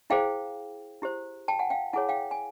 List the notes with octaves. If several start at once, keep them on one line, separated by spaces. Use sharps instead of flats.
E4 G#4 C5 F5 G5
E4 G4 C5
G5 A5
F#5 G#5
F5 G5
E4 G#4 C#5 F#5 G#5
F5 G5
G#5